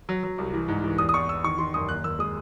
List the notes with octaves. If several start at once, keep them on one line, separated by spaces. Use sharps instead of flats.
F#3
F#3
C2
E3
G#2
E3
E2 D#6
D#6
E2 C#6
E2 E6
D#3 C#6
D#3 C6
F#2 D#6
D#2 F#6
D#2 E6
G#3 D#6